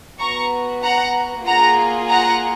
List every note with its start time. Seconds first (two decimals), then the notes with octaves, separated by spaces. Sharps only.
0.19 B3 F#4 A#5 C#6
0.83 F#5 A#5
1.46 A#3 F4 G#4 F#5 A#5
2.10 F#5 A#5